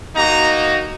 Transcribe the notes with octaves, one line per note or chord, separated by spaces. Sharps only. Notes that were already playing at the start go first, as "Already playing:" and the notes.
A#3 D#4 F#4 A#5